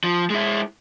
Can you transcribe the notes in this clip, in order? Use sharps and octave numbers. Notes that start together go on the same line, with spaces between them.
F3
G#3 E4